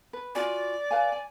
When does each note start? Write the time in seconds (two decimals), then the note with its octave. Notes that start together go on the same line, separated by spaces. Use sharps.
0.13 B4
0.35 F4 F#4 D5 G#5
0.91 B4 F5 G#5
1.12 G#5